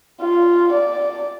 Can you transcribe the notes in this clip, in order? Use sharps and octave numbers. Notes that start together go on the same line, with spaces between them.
F4
D5